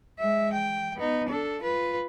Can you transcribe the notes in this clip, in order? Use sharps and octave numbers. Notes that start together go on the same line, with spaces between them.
G#3 E5
G5
B3 D#4
D4 A4
F4 B4